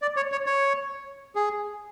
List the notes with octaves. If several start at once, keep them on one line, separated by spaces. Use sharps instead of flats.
D5
C#5
C#5
C#5
G#4